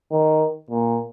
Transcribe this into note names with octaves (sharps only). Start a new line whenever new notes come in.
D#3
A#2